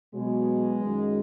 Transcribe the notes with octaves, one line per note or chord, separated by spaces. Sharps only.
B2 F#3 G#3
F#2 D#3 F#3